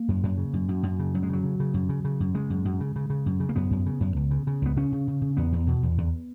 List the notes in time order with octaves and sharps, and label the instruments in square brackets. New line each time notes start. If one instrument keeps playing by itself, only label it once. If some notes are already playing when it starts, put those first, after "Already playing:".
Already playing: [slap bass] A#3
F#2
F#2
C#3
F#2
F#2
F#2
C#3
F#2 F#3
G#3
C#3 F#3
C#3
C#3
F#2
C#3
C#3
F#2
C#3 G#3
F#2
F#2
C#3
C#3
C#3
F#2
C#3
A#3
F#2 B3
F#2
C#3
F#2
C#2
C#3
C#3
C#2 B3
C#3 C#4
C#3
C#3
C#3
E2 B3
E2
B2
E2
E2